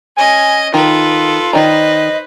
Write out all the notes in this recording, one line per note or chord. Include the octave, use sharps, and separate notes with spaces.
C#4 D#5 G#5
D#3 F4 A4 B4
D#3 B4 C5 D5 D#5 A#5